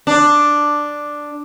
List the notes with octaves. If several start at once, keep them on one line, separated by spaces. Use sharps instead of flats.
D4